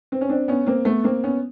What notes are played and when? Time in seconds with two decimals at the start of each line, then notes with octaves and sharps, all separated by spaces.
0.12 C4
0.21 C#4
0.29 C4 D4
0.48 B3 C#4
0.66 A#3 C4
0.85 A3 B3
1.04 A#3 C4
1.24 B3 C#4